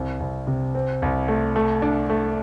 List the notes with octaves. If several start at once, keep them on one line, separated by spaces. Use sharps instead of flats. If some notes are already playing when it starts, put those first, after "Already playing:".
Already playing: C2 C4
C2
C3
C4
C2
A3
A3
D4
A3